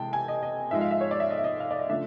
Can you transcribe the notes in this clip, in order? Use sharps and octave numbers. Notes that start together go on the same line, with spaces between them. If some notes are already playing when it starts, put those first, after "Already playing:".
Already playing: C3 E3 G#3 G5 A5
G#5
D#5
D#5
G#2 F3 G#3 E5
F5
E5
C#5
D5
E5
D#5
E5
D#5
F5
D5
D#5
C#3 F3 A3 D4 E5